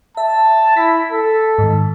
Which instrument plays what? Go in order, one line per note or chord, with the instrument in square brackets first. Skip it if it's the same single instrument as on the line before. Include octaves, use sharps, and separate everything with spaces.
[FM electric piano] E5 [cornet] A5
[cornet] E4 [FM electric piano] B6
[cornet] A4
[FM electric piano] G#2 D#3